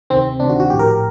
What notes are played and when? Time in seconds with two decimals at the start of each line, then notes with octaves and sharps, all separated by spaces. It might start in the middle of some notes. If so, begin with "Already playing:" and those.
0.10 D2 C3 D#3 C4
0.40 D2 C3 D#3 D4
0.49 F#4
0.60 F#4
0.70 A#1 A2 G4
0.79 A#4